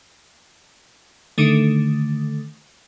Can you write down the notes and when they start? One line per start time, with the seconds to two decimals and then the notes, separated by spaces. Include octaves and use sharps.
1.38 D3 D#3 A3